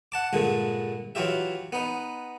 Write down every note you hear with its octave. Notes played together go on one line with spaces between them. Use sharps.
F#5 A5 D6
G2 A#2 D3 G#3
E3 F#3 F4 G4 E5
B3 D#4